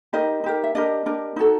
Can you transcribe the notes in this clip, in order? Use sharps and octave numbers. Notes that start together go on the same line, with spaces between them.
D#4 G4 A#4 D#5
D#4 G4 A#4
E5
D4 G4 A#4 D#5
D4 G4 A#4
D#4 F#4 A4